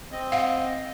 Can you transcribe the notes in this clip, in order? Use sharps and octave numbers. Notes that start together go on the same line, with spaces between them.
C4 D#5
F5 F#5